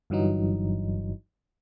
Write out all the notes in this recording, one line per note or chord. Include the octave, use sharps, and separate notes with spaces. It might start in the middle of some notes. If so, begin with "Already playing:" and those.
G1 G2 E3 F#3 D#4